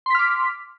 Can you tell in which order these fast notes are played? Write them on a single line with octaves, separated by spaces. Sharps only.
C6 B6 F6 D6